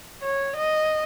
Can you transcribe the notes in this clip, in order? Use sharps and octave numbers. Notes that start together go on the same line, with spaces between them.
C#5
D#5